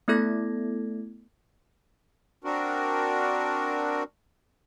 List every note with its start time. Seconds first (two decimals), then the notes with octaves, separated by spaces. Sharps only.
0.08 A3 B3 E4 A4 G#6 A#6
2.44 C4 D4 F#4 A#4